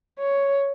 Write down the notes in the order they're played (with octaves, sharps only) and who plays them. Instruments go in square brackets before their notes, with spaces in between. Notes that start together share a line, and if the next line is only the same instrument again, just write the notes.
[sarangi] C#5